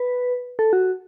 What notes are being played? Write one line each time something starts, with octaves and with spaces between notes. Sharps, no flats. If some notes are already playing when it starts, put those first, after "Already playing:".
Already playing: B4
A4
F#4